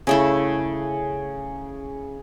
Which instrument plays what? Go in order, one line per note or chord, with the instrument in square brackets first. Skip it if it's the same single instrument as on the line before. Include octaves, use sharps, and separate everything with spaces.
[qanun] C#3 A3 E4 [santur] G#4